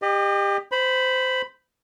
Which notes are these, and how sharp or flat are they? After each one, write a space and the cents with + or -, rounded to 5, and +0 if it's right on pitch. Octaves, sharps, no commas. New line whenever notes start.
G4 +25 D#5 -30
C5 -20 B5 +5